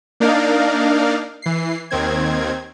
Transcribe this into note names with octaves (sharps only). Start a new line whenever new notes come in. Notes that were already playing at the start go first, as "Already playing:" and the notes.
A#3 D4 D#4 A#4 D5 F5
E3 C7
D#2 D#3 C4 G#6